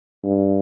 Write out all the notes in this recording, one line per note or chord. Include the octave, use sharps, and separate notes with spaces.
G2